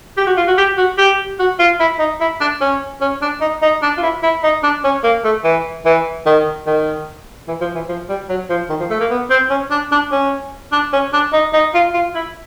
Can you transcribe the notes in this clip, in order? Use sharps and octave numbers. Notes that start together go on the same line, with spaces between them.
G4
F#4
F4
F#4
G4
F#4
G4
F#4
F4
E4
D#4
E4
D4
C#4
C#4
D4
D#4
D#4
D4
F4
E4
E4
D#4
D4
C#4
A#3
A3
E3
E3
D#3
D#3
E3
F3
E3
F3
G3
F#3
F3
D#3
F3
A3
A#3
B3
C4
C#4
D4
D4
C#4
D4
C#4
D4
D#4
D#4
F4
F4
E4